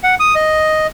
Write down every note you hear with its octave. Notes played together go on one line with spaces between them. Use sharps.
F#5
D#6
D#5